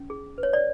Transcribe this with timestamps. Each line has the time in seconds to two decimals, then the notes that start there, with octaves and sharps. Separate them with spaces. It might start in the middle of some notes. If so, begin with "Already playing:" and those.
Already playing: C#4
0.10 G#4
0.38 B4
0.43 C#5
0.53 D5